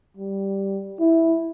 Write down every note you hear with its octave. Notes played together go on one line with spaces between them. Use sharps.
G3
E4